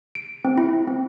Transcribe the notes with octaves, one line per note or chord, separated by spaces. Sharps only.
D7
C4
E4
C4